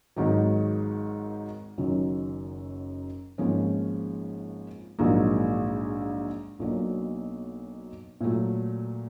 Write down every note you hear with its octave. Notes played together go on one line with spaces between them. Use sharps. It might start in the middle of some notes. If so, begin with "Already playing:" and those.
G#1 G#2 D#3 F#3
F#1 F#2 D#3 F#3
G#1 G#2 F3 A#3 C#4
A#1 G#2 D#3 F#3 A#3
B1 B2 F#3 A#3 D4
A#2 F#3 A3